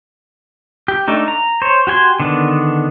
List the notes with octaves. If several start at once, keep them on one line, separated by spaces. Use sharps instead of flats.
G4
A3 D4 D#4
A#5
C5 C#5
F#4 G4 G#5 C6
D3 D#3 B3 D4